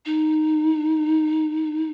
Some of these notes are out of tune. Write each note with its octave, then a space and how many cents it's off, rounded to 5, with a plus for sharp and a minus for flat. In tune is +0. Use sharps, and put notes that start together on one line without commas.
D#4 -5